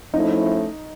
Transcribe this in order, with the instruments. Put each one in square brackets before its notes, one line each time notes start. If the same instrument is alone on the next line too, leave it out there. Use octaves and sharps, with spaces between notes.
[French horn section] F3 A3 C#4 E4 [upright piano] D#4